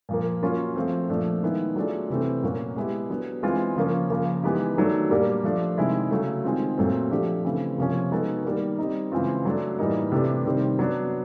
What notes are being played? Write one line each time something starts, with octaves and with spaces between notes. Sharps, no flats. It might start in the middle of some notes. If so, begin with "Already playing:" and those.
A#2 F3 A#3
F#3 A#3 C#4 F4
F3 A3 C4
A#2 F3 A3 D4
D#3 G#3 B3 E4
F#3 A3 D4 F4 G#4
C3 E3 A3 C4
A#2 F#3 A#3 C#4 F#4
G#3 B3 E4 G4
D3 F#3 B3
E3 G#3 C4 F4
C#3 F3 A#3 C#4
C#3 F3 A#3
E3 G#3 B3 D#4 G4
D#3 F#3 A3 D4
A#2 G3 A#3 D4 G4
F3 A3 D4
C3 D#3 G#3 C4 E4
C#3 F#3 A3
D#3 G#3 C4 F4
A#2 F#3 A3 C4
D3 F3 A3 D4 G4
C#3 E3 A3 C4
C3 F3 A#3 C#4
G#3 B3 D#4 F#4 A4
D#3 G3 A#3
G3 C4 D#4
C#3 E3 G#3 C4 F4
F#3 A3 D4
A2 E3 G3 A#3 D#4
C3 E3 A3 D4 G4
C3 D#3 G3 C4
F#3 B3 D4